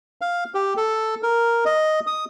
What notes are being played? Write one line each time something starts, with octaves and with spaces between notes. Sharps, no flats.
F5
G4
A4
A#4
D#5
D#6